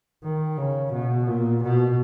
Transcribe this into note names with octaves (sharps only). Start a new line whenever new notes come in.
D#3
C#3
B2
A#2
B2